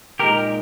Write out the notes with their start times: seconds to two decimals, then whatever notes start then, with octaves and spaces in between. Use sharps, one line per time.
0.19 A#2 G#3 D#4 G4 A#4